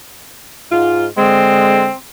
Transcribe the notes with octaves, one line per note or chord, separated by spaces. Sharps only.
G#2 F4
D3 G#3 C4